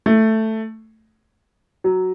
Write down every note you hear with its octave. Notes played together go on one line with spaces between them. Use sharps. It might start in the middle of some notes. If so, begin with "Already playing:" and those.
A3
F#3